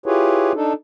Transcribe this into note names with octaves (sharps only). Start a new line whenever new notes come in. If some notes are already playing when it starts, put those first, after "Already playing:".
E4 F4 G4 G#4 B4 C#5
D4 D#4 A4